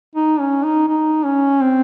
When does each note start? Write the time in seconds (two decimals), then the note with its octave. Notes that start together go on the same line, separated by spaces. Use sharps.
0.15 D#4
0.40 C#4
0.64 D#4
0.88 D#4
1.25 C#4
1.61 C4